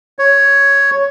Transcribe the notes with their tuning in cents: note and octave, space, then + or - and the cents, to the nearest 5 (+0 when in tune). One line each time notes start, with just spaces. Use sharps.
C#5 +5